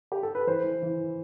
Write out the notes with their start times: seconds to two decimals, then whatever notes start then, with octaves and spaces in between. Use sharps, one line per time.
0.12 G4
0.23 A4
0.35 B4
0.47 E3 C5
0.64 E3
0.82 E3